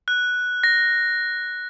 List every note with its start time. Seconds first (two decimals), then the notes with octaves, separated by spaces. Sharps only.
0.08 F#6
0.64 A#6